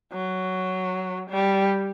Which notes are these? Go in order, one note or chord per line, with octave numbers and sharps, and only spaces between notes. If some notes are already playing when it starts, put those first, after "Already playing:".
F#3
G3